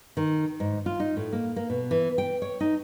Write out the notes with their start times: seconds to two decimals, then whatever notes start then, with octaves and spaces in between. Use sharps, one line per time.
0.17 D#3
0.60 G#2
0.86 F4
1.00 D#4
1.17 A2
1.33 A#3
1.56 A#3
1.70 B2
1.91 E3
2.18 G5
2.42 C#5
2.61 D#4